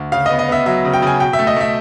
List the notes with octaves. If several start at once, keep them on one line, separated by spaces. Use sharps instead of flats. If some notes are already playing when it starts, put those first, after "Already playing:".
Already playing: D2
C#3 F5
D#5
B3
D#5
B3 E5
F#3 E5
C#3
G5
C#3 G#5
B2 G5
E5
A3
D#5
A3 E5